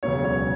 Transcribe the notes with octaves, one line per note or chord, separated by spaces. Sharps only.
E1 D2 C#3 F#3 B3 C#5
C#5